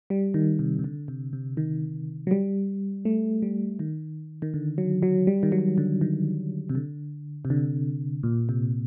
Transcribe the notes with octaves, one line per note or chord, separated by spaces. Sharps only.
G3
D#3
C3
C3
D3
C3
C3
D#3
F#3
G3
A3
G3
D#3
D#3
D3
F#3
F#3
G3
D#3
F#3
D3
D#3
C3
D3
C3
D3
A#2
C3